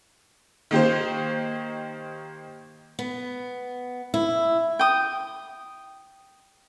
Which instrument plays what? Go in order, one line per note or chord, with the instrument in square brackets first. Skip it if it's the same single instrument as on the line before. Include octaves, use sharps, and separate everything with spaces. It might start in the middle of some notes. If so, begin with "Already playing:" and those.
[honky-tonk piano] D#3 A#3 G4 C5
[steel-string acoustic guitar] B3
E4
[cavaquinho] G5 D#6